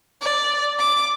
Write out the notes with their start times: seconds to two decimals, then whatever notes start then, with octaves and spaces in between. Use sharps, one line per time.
0.22 D5
0.79 D6